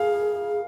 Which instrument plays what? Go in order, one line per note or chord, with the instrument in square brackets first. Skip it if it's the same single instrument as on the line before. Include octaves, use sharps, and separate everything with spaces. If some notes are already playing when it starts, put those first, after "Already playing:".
Already playing: [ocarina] G#4 [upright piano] F5